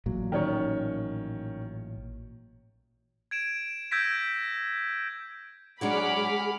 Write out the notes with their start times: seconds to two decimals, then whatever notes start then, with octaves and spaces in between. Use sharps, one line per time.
0.06 A1 A#2 F#3
0.32 D#3 C#4 C#5
3.31 G#6 D7 E7
3.91 E6 G6 G#6 A#6 B6 D7
5.81 F#3 G#3 D4 G#4 F#5 B5 D6 F6